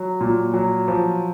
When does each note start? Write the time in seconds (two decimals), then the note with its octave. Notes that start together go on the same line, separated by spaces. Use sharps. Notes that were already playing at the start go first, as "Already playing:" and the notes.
Already playing: F#3
0.21 A#2
0.54 F#3
0.88 F3